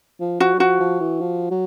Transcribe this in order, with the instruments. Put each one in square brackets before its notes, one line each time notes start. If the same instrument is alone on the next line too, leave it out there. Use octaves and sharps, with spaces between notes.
[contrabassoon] F3
[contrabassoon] F3 [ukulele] F#4
[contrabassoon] F#3
[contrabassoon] F3 [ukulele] F#4
[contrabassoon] F3
E3
F3
F#3